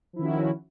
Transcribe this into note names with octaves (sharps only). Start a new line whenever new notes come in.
D#3 F3 C#4 E4 F#4